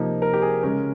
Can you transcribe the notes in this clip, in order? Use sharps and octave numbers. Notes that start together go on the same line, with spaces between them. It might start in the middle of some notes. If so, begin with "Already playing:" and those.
Already playing: C3 F3 A#3 D#4
A#4
G4
G#4
C#3 G#3 C#4 A#4